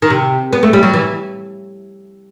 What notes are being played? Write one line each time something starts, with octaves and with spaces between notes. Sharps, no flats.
D#3
C3
B3
A3
G3
F#3
E3